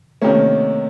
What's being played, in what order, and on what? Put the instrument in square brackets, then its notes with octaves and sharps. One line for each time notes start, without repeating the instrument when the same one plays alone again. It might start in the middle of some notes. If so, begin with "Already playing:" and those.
[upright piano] C3 D#3 A#3 C#4 [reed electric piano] A3